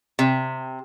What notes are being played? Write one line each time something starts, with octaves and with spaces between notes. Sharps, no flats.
C3